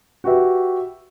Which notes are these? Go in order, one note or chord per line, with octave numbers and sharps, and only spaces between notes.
F#4 G4 B4 E5